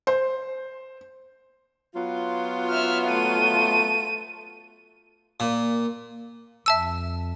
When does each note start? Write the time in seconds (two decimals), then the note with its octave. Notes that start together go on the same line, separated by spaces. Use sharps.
0.07 C5
1.96 F#3 B3 F4
2.70 E5 F6
3.08 A3 D#7
5.40 A#2
6.66 F2 E5 A5 E6